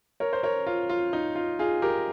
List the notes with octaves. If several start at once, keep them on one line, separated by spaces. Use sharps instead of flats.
A#4 C#5
C5
A#4 C#5
F4
F4
D#4
F4
F4 G#4
G4 A#4